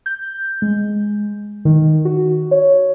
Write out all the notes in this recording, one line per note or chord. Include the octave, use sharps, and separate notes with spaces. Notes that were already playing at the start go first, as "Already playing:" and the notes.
G6
G#3
D#3
F#4
C#5